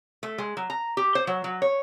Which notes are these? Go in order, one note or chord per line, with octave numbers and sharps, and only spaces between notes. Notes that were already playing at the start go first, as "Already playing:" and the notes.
A3
G#3
F#3
A#5
G4
C5
F#3
F#3
C#5